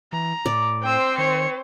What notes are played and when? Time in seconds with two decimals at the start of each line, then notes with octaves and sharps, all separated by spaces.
0.13 E3 A#5
0.46 A2 D5
0.83 C4 C5 G5 E6
1.18 D#3 C#5 C#7